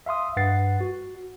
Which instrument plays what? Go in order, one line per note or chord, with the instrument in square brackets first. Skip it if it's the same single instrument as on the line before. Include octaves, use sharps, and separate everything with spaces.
[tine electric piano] E5 F5 C6 D#6
G2 B4 F#5 A6 C7
F#4